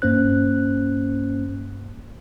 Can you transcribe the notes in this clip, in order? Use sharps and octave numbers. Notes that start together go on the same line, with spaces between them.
G2 A#3 C#4 C5 F#6